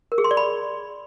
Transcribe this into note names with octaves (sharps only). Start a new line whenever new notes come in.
A#4
G#4
C6
D5
B5